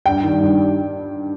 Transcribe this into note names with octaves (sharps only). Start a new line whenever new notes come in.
G2 G5
D#3 G3
G2
G3